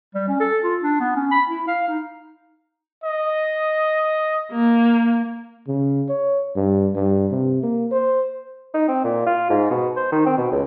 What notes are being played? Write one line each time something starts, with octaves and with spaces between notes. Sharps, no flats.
G3
C#4
A4
F4
D4
B3
C#4
B5
E4
F5
D#4
D#5
A#3
C#3
C#5
G2
G2
C3
A#3
C5
D#4
C4
A#2
F4
G#2
B2
C5
D#3
C4
B2
C#2